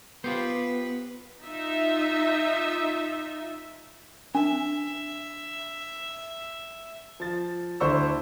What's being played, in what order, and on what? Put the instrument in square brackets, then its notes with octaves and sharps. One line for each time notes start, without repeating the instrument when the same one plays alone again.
[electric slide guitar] B3 [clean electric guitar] F4 G4 C5 [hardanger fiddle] B4
[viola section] D#4 F4 E5
[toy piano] D4 [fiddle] E5
[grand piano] F3 A6
D2 D3 E4 C5 C#6 E6